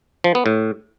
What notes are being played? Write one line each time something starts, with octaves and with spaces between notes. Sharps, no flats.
F3
B3
A2